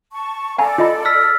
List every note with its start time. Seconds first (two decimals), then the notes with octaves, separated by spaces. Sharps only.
0.13 A5 C#6
0.58 A4 D5 F5 G#5 A#5
0.78 F4 D#5 B5
1.05 E6 F6 B6